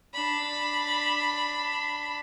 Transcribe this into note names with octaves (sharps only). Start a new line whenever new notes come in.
D4 B5